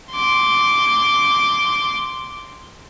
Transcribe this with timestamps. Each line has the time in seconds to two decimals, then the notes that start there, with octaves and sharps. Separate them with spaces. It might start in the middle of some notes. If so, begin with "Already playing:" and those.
0.12 C6 D6